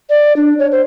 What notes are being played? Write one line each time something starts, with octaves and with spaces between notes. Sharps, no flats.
D5
D4
C#5
C5